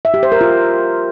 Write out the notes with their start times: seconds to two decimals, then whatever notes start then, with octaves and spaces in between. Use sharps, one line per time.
0.05 E5
0.14 G4
0.23 C5
0.32 A#4
0.41 F4